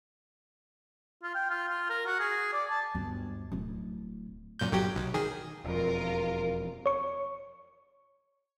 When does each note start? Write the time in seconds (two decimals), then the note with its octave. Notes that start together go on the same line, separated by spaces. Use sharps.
1.23 F4
1.35 G5
1.50 F4
1.69 F4
1.90 A#4
2.06 F#4
2.19 G#4
2.53 D5
2.70 A5
2.95 G1 D2
3.52 D1 E4
4.59 F#2 A#2 G6
4.72 G1 F#3 G4
4.96 B1
5.14 D#3 G#4
5.64 E1 F2 F4 A#4
6.86 C#5 C#6